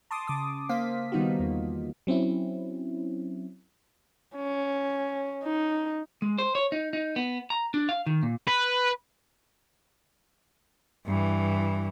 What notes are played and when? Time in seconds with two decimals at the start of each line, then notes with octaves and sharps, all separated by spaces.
0.11 A5 C6 D6 D#6
0.27 C#3 D6 D#6
0.69 A#3 C5 F5 B6
1.12 D#3 G3 B3 D#4 F4 F#4
1.39 E2 A#3
2.07 F#3 C4 C#4 E4
4.36 C#4
5.44 D#4
6.22 G#3
6.38 C5
6.55 C#5
6.72 D#4
6.93 D#4
7.16 B3
7.50 A#5
7.74 D4
7.89 F5
8.06 D#3
8.22 A#2
8.48 B4
11.06 G2 E3